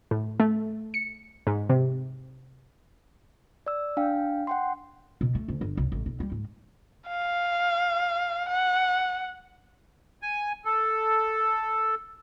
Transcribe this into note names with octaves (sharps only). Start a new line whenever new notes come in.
A2
A3
C#7
G#2
C3
D5 E6
D4 F5 G5
F#5 G5 C6
B2
A3
D2
G1
C2
A1
B1
G3
G#2
F5
F#5
G#5
A4